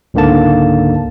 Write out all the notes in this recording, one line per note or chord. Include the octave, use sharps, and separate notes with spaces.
C#2 G#2 D3 A#3 A5